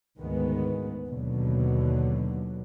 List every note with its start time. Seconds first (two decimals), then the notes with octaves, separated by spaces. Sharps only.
0.19 D2 G#2 D#3 G#3 B3
1.07 D#2 B2 D3 F#3